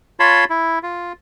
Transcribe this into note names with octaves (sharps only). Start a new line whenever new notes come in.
F4 C#5 A5 B5 C6
E4
F4